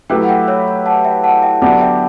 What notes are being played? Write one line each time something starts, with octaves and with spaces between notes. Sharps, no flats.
F#3 A3 E4 G4 B4 E5 G5
F#5
E5 G5
C#5 E5
F#5 A5
E5 G5
F#5 A5
E5 G5
D3 F#3 B3 D4 G4 F#5 A5
E5 G5